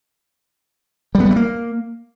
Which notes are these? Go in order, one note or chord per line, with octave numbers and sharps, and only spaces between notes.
G3
B3
G3
A3
A#3